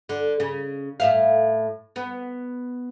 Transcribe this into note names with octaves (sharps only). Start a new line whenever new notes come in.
D3
C#3
A2 E5 F5
B3